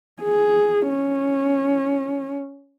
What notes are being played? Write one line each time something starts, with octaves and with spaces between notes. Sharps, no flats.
G#4
C#4